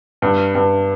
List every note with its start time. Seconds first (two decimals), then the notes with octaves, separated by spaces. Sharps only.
0.22 G2
0.55 G2